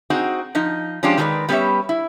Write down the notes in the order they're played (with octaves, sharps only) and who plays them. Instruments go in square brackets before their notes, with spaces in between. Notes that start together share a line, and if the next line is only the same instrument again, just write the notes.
[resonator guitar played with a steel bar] C4 D#4 F#4 G#4
F3 D#4
F3 G#3 C#4 D4 F4 G4
D#3 G#3 G4 A4 B4 D5
G3 B3 C#4 G4 C#5 E5
E4